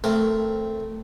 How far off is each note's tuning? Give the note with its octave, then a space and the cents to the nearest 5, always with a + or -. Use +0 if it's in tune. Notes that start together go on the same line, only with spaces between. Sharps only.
A3 +5 C4 -5 A#4 +0